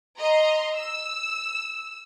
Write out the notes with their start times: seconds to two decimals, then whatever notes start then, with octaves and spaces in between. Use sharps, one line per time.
0.19 D#5 A#5 C6
0.75 E6